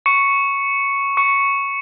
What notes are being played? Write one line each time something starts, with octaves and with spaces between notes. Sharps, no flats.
C#6 C#7
C#6 C#7